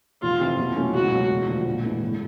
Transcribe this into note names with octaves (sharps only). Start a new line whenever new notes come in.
F1 F4
F2 C3 E3
B2
F#3 A3 C#4 E4
C#2 F#4
B2 F#3
E1
D2 D3 F3
A#1
G#2 E3 A3
F#1